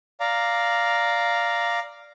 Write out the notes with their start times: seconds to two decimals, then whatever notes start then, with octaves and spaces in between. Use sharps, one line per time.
0.20 D5 F5 A#5